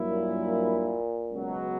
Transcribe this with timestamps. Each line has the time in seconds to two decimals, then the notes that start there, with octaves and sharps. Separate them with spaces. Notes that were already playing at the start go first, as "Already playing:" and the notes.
Already playing: G2 F#3 A#3 E4
0.09 A#2
1.31 C#2 B2 F#3